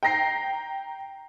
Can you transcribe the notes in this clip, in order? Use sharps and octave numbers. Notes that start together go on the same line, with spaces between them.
G5 A#5 A#6 C7